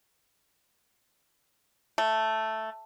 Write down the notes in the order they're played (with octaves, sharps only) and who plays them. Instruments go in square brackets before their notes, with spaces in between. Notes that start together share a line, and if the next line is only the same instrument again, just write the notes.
[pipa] A3